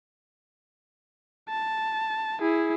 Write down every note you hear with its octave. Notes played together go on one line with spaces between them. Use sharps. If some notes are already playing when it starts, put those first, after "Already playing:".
A5
E4 G#4